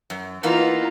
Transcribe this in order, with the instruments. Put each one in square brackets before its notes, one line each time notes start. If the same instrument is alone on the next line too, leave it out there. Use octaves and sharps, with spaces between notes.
[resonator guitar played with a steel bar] F#2
[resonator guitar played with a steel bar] E3 A#3 B3 [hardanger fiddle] D#4 F4